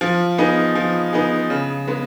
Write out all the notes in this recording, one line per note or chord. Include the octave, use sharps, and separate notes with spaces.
F3
B3 D#4 G#4
F3
B3 D#4 G#4
C#3
G#3 B3